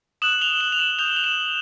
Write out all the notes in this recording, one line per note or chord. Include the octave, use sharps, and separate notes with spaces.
D#6 F#6 E7 F#7
F7 G7
E7 F#7
F7
E7 F#7
D#6 G6 F7 G7
F7
E7 F#7